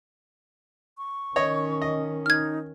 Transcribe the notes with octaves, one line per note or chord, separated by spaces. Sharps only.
C#6
D#3 C#4 C#5 D#5
D#5
D#4 F6 G#6